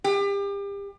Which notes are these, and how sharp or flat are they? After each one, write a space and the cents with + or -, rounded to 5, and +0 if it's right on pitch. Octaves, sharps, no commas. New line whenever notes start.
G4 +35